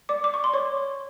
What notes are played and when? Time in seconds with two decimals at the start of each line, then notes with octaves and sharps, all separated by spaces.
0.09 D5 D6
0.24 D6
0.34 C#6
0.44 C6
0.54 C#5 C#6